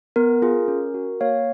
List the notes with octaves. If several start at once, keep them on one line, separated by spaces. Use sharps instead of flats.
B3 A#4
F4 G#4
C#4
F#4
A#3 C#5 F5